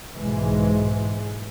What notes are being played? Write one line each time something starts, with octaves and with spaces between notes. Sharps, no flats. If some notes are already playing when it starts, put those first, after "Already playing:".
B1 G#2 E3 G#3